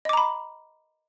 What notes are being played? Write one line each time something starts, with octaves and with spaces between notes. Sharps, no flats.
D#5 A#5 B5 D6